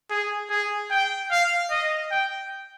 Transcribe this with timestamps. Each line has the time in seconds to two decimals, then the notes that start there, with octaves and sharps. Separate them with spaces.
0.10 G#4
0.50 G#4
0.91 G5
1.31 F5
1.71 D#5
2.11 G5